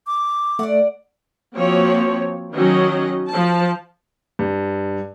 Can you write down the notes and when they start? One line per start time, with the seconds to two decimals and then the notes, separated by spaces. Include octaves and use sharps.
0.07 D6
0.59 A3 D5 F#5
1.55 F3 A#3 C4 F#4 C#5
2.54 D#3 F#3 C#4 D#4 D#5
3.29 F3 A5
4.39 G2